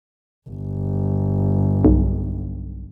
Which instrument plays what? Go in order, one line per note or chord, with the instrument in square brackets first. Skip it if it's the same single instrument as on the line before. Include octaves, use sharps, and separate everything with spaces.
[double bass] G1
[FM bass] B1